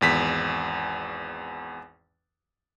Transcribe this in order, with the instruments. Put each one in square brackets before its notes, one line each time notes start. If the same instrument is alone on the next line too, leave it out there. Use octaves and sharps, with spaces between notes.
[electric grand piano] G#1 E2 B6